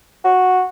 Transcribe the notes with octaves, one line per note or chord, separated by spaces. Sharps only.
F#4